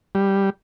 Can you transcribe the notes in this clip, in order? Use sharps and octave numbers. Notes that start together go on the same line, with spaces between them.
G3